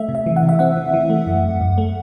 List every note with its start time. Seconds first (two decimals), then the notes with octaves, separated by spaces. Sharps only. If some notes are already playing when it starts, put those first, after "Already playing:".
Already playing: A3 E5
0.09 C3
0.15 E5
0.26 E3
0.36 F#5
0.43 C3
0.49 E5
0.59 C4 F#5
0.77 E3
0.94 E3
1.10 A3
1.27 F#2
1.44 F#2
1.61 F#2
1.78 A3